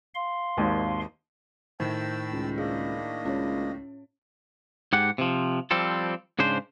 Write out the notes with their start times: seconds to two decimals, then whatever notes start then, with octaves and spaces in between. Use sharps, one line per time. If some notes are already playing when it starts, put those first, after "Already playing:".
0.15 F5 C6
0.57 G#1 D#2 G#2
1.80 A2 D#3 C5 G5 A5 E6
2.32 C#2
2.58 A#3 D4 G#4 D#5
3.25 C#2 C#4 C#5
4.93 G#2 G4 F#5
5.18 C3 F3
5.71 F3 G3 C4 A4
6.39 G#2 C#3 D4 C5